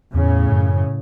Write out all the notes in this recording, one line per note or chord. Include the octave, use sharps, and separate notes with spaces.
E2 A2 C#3
F#2